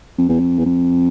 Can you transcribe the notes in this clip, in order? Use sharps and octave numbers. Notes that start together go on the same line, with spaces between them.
F2
E2
F2
E2
F2